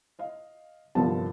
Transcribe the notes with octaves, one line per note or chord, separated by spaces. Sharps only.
D#5 F5
G1 C2 G2 F3 B3 A5